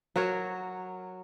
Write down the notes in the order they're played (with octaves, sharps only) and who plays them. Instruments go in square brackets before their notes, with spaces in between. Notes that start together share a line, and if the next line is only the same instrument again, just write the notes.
[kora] F#3 F#4 A#4 C#5